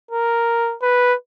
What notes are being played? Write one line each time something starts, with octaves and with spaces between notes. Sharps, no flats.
A#4
B4